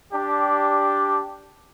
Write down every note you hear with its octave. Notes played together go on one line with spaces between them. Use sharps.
D4 G4